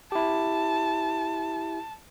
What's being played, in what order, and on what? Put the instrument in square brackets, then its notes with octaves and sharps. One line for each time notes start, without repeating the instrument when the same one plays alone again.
[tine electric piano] E4 G4 [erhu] A5